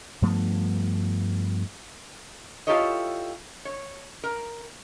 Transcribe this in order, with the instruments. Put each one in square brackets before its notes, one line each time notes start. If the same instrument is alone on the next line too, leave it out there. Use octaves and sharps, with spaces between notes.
[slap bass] G2 F3 A3 B3
[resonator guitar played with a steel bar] E4 F4 G4 A4 C#5 D#5
C#5
A#4